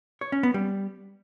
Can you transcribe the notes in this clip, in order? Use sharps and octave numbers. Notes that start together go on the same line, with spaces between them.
C#5
C#4
B3
G3